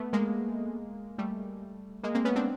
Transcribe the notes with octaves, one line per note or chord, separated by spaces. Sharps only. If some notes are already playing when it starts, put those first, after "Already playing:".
Already playing: A3 B3
G#3 A#3
G3 A3
G#3 A#3
A#3 C4
B3 C#4
C4 D4